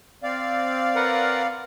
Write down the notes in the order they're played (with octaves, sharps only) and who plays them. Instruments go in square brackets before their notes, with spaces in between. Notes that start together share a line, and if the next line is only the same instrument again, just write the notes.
[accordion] C4 D5 F5
[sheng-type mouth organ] A#4 B4 F#5